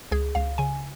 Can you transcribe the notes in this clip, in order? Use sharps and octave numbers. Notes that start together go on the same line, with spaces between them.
C#2 G#4
C#2 F5
C#3 G#5